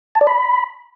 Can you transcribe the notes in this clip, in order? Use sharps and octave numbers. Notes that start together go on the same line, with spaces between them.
A5
D5
B5